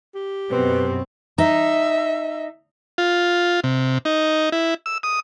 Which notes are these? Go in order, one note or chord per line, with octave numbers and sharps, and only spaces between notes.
G4
F#2 B2 C4 B4
D#4 E5
F4
C3
D#4
E4
E6
D#6